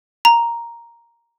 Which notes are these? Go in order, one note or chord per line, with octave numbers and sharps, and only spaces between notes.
A#5